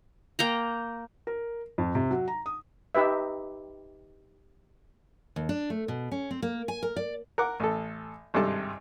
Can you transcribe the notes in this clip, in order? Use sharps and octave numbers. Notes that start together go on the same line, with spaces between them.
A#3 G5 A#5
A#4
F2
C3
F#3
A#5
D#6
D#4 G4 B4 E5
D#2
D4
A3
B2
C#4
C4
A#3
G#5
A#4
D5
A#4 F#5 D6
A1 A4
G#1 G2 C3 A4 A5